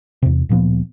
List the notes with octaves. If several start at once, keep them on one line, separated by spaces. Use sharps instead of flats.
E2 C3
D1 A#2 F3 B3